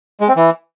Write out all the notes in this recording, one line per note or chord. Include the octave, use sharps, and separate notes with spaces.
G#3
C4
E3